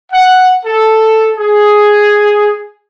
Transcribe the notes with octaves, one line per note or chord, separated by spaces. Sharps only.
F#5
A4
G#4